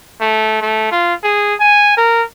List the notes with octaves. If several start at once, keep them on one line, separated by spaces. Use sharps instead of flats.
A3
A3
F4
G#4
G#5
A#4